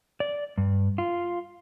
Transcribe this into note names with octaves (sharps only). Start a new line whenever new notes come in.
D5
G2
F4